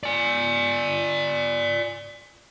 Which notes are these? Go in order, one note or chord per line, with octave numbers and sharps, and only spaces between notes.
D5 G#5